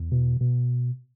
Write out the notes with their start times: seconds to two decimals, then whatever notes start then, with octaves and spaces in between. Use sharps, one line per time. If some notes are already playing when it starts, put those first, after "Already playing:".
Already playing: E2
0.12 B2
0.41 B2